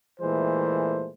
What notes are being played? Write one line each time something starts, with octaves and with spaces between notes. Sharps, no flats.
A#2 E3 G#3 A3 C5